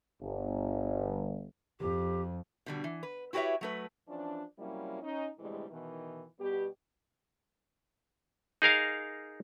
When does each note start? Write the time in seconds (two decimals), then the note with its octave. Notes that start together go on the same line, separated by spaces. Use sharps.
0.21 G1
1.80 F2 G4
2.66 B2 D3 G3
2.84 E3
3.03 B4
3.33 E4 F#4 G4 B4 C#5 E5
3.61 F#3 A3 B4
4.08 E3 F3 C#4 D4
4.58 C3 F#3 G3 A#3 C#4 E4
5.02 C#4 D#4
5.39 D2 A2 C3 E3 G3 G#3
5.70 B2 D#3 E3
6.39 B2 G3 B3 G4
8.62 D#4 G#4 A#4 F5